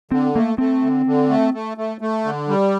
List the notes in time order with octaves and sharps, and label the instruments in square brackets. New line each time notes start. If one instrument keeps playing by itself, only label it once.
[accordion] D3 [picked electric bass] C4
[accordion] A3 [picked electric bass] A#3
[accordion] A3 [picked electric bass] C4
[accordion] D3
D3
A3
A3
A3
A3
D3
G3